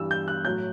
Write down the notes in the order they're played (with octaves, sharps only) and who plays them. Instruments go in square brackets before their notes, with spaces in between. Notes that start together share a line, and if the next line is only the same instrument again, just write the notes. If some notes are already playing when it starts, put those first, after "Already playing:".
Already playing: [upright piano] G2 E3 G3 E6
G6
F#6
A2 F#3 G6